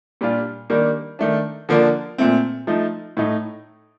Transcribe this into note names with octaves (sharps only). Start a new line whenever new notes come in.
A#2 G3 D4 F4
D#3 G3 A#3 D4
D#3 A3 D4
D3 F3 A#3 D4
A#2 A3 C4
F3 A3 D#4
A2 A3 D#4